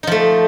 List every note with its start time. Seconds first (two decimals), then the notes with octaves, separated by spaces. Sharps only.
0.03 D#4
0.07 F3
0.12 A3